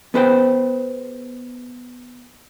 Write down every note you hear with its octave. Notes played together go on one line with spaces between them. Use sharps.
B3 G#4 B4 C5 F5 G5